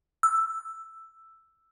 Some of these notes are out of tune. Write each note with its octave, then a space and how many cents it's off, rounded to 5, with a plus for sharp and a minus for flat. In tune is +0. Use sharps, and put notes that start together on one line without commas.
E6 +5